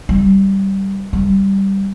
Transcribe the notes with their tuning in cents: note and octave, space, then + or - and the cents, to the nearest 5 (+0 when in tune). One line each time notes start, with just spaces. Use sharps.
G3 -10
G3 -5